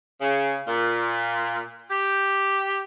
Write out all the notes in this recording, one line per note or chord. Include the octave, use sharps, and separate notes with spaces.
C#3
A#2
G4